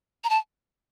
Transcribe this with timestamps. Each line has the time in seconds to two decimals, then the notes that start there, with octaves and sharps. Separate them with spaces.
0.24 A#5
0.30 A5